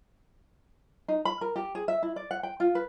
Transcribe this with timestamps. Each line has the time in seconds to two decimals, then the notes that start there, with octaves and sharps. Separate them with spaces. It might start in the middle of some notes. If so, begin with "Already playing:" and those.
1.08 D#4
1.25 B5
1.41 A#4
1.56 G4
1.75 G#4
1.88 E5
2.03 E4
2.16 D5
2.31 F#5
2.43 G5
2.60 F4
2.75 B4